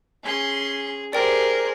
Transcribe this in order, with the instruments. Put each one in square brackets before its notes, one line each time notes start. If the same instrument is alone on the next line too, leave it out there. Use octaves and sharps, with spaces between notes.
[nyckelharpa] C#4 C6 [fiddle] G#4
[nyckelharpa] G4 [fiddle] G#4 C5 [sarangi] A#4 [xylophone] D5 G5